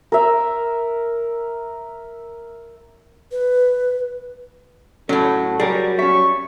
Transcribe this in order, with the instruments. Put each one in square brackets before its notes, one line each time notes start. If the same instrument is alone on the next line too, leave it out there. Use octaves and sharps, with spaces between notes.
[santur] A#4 E5
[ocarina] B4
[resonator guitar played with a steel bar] A2 F#3 [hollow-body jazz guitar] C#4 [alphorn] A4
[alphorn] F#3 [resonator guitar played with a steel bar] G3 [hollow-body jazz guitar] G#4 A#4 C#5
[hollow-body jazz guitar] C#4 E5 [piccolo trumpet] C#6